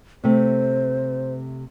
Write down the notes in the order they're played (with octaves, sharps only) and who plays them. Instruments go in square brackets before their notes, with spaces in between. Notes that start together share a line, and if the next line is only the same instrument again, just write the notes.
[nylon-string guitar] C3 A3 [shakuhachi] C5